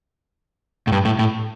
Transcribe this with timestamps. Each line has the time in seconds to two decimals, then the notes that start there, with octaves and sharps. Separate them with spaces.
0.87 A2
0.92 G2
1.05 A2
1.19 A2